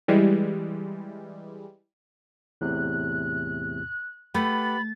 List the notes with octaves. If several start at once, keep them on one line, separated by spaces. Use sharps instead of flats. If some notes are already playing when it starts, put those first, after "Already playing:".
E3 G3 G#3
E2 A2 C3 F#6
A3 G4 B4 F#5 B5 A6